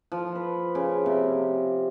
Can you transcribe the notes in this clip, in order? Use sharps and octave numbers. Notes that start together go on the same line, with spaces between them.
F3
B4
C#3
C3